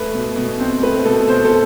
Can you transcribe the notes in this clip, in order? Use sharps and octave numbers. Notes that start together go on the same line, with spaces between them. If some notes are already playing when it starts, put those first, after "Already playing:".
Already playing: A3 B4
B2
B2
C4
A3 B4
B2 A4
B2 C5
A4